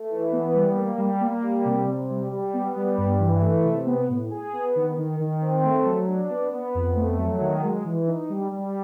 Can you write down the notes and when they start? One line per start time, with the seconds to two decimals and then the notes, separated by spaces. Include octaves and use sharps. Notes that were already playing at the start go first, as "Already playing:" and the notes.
Already playing: A3
0.11 E3
0.32 B3
0.54 G3
0.76 A#3
0.98 G3
1.21 A#3
1.43 G3
1.65 C3
1.87 C3
2.10 G3
2.32 G3
2.54 B3
2.76 G3
2.98 G2
3.19 E3
3.42 A3
3.65 C3
3.87 B3
4.09 A2
4.31 G#4
4.53 B3
4.76 D#3
4.97 D#3
5.20 D#3
5.41 C4
5.64 A3
5.85 F#3
6.08 D4
6.30 B3
6.52 B3
6.75 F2
6.96 A3
7.19 F#3
7.41 D#3
7.63 G#3
7.85 E3
8.07 D#4
8.30 G3
8.52 G3